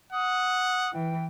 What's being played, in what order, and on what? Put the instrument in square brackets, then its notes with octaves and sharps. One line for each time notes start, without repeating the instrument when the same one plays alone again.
[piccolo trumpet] F#5 [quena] D#6
[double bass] E3 [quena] G5